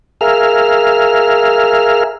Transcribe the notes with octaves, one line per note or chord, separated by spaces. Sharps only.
G#4 A#4 E5 F5 F6